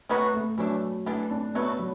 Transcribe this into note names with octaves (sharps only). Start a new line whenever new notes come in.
B2 F#3 A3 B3 F#4
A3
E3 F#3 A3 D4
E3 A3 B3 D4
D4
F#3 A3 B3 F#4 B4
F#3